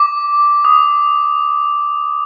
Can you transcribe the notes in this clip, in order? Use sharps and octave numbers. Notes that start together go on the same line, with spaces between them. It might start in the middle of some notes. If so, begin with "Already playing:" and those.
Already playing: D6
D#6